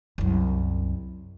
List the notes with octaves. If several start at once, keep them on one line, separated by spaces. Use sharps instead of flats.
C2 F#2